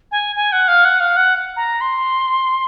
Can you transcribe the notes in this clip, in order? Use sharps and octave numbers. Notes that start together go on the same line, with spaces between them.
G#5
G#5
F#5
F5
F#5
F5
F#5
A#5
C6